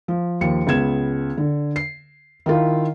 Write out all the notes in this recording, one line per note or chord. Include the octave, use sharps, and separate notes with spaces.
F3
D#2 F3 C#7
C#2 B3 G#6 E7
D3
C7
D#3 E4 F4